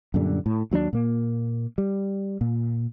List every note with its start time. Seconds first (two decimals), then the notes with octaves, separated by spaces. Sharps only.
0.14 F#2 A#2 D3 G3
0.46 A2
0.71 D#2 F#3 A#3 D4
0.93 A#2 A#3
1.78 G3
2.41 A#2